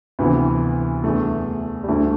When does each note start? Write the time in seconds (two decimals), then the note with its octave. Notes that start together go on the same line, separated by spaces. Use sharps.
0.19 D2 C3 E3 B3
1.04 E2 D3 A3
1.84 G3
1.88 D2 D3 A3